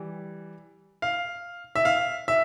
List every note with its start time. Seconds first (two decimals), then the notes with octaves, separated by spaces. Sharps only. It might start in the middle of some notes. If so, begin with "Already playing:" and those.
Already playing: E3 G3
1.02 F5
1.75 E5
1.85 F5
2.28 E5